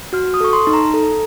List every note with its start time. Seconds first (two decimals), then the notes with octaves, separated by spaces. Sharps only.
0.13 F#4 F6
0.34 D#6
0.41 A4 C#6
0.53 C6
0.67 D#4
0.73 A#5
0.94 A4